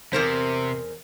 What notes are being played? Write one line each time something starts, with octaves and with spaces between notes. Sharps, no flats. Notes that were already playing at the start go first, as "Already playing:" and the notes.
E2 C3 A#4 C5